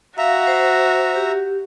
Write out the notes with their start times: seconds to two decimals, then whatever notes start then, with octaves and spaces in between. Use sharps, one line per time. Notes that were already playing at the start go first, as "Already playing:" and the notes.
0.18 F#4 E5 F5 A#5
0.47 C5
1.16 G4